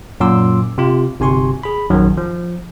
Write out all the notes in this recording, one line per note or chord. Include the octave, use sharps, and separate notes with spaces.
F#2 A#2 C6 D6 E6
C3 F4
G1 C3 G#5 C6 C#6
G#4 B5
A#1 F#2 D#3 F#3
F3